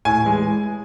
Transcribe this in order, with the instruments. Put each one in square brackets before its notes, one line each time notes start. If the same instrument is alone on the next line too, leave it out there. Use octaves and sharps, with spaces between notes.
[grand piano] A2 G#5
E3 G#3